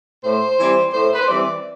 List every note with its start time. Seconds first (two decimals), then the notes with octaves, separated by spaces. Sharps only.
0.24 A2 C5
0.59 E3 G3 C4
0.94 A2 C5
1.14 B4
1.21 C5
1.28 E3 G3 C4 D5